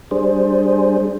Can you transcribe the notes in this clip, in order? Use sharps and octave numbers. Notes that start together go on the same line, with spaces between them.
G3 D4 G#4 C5